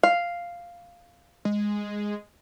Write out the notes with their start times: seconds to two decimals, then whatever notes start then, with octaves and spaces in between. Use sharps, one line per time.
0.03 F5
1.45 G#3